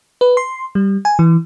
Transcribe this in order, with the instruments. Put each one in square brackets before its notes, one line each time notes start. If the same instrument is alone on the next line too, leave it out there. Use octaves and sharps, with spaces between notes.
[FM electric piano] B4
C6
G3
G#5
E3